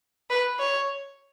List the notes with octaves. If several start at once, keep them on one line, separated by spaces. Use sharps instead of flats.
B4
C#5